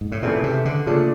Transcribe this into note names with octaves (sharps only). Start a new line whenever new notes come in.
G#2
A2
A#2 C#3 E3 A3 C4 E4
C3
D3
A#2 C#3 F3 A3 D4